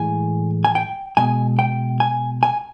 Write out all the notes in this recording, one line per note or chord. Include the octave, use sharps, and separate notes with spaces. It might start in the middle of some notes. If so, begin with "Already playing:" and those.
Already playing: A2 E3 G#3 G#5
G#5
G5
B2 G#3 G#5
G5
G#5
G#5